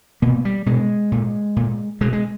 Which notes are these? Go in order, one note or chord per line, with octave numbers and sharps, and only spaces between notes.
B2 A#3
G3
B2 G#3
A#2
A#2
B2 G#3
G#3